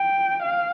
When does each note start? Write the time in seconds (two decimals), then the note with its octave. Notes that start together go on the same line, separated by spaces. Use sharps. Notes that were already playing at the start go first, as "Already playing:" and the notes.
Already playing: G5
0.42 F5